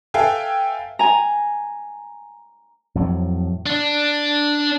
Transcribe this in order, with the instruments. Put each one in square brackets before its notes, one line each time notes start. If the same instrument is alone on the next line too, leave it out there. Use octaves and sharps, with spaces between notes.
[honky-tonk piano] A4 B4 E5 F5 G5 G#5
[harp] G#5 A#5
[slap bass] F2 A2 F#3
[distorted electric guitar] D4